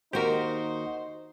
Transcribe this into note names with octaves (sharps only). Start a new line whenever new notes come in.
D#2 D#4 F#4 G4 A#4 C5